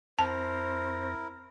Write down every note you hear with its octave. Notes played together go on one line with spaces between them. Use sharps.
F2 C4 E4 A#4 C5 A5 A#6